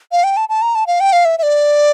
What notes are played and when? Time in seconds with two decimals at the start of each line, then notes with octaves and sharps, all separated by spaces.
0.12 F5
0.24 G5
0.37 A5
0.49 A5
0.62 A#5
0.75 A5
0.87 F5
1.00 G5
1.13 F5
1.25 E5
1.38 E5
1.43 D5